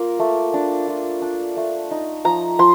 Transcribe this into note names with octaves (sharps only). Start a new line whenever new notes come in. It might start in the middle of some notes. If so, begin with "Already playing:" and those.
Already playing: A#3 F4
A3
D4
F4
D4
A3
D#4
F3 A#5
F3 C6